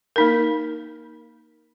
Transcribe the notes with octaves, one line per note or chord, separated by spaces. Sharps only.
A#3 D#4 A#4